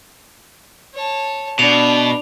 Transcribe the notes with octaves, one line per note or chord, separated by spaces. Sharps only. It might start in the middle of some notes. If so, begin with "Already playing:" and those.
C#5 A5
B2 D4 F7